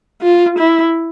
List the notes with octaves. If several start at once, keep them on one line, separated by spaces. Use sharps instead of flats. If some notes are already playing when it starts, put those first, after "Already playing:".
F4
E4